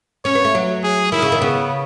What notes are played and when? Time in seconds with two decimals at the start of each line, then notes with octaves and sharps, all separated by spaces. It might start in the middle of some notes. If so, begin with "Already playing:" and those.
0.25 C#4 C#5
0.35 B3
0.45 A3
0.55 F#3
0.83 G#4
1.12 D#3 E4
1.22 C#3
1.32 D#3
1.41 C#3 B3